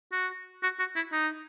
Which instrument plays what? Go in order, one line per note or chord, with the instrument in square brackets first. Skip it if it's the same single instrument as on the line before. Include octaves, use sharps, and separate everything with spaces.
[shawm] F#4
F#4
F#4
E4
D#4